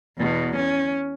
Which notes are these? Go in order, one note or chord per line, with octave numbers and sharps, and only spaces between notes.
E2 B2
C#4